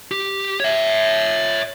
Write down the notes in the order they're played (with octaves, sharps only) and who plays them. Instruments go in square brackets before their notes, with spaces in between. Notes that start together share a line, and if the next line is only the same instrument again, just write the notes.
[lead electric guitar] G4
C#5 E5